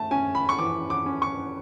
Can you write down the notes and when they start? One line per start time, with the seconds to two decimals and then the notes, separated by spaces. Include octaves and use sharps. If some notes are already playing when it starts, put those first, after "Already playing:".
Already playing: A3 A5
0.11 C#4 G#5
0.35 B5
0.49 C#6
0.58 E3 D6
0.90 D6
1.06 C#4
1.22 C#6